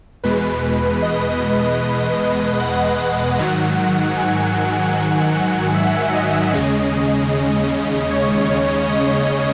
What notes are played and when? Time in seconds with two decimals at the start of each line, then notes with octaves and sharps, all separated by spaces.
0.24 E2 B2 G#3 B4
1.02 D#5
2.60 F#5
3.39 G#2 D#3 F#3
4.17 G#5
4.96 F#5
5.74 E5
6.14 D#5
6.53 D#2 C#3 G#3 C#4
8.11 C#5
8.50 C#5
8.89 D#5